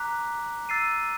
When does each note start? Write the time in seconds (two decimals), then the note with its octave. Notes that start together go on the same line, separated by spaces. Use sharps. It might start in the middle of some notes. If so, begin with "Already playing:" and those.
Already playing: A#5 D6 F#6 B6
0.69 E6 A6 C7 D#7